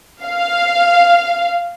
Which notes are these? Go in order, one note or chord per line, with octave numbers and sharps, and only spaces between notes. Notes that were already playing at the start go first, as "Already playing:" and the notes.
F5